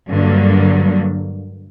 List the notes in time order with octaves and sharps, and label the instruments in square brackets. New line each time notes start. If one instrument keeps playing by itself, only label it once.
[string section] G2 D3 F#3 A#3